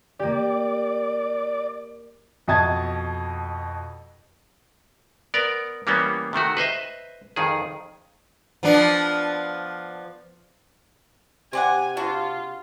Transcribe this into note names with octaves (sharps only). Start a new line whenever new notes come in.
A#3 G4 D5
F2 B2 D#5 A5 G#6 A6
B3 A#4 D5
E3 G3 A#3 B3 C#4
C3 D#3 A3 F#4
B4 C5 D#5 E5
F2 D#3 G#4
F3 B3 D4
C3 C4 D5 F#5 G#5
D4 F4 F#4